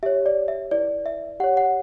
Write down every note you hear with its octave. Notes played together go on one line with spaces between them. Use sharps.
G4 C#5 E5
D5
E5
E4 B4 D5
E5
G4 C#5 F#5
F#5